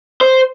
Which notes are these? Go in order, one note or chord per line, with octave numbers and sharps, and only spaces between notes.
C5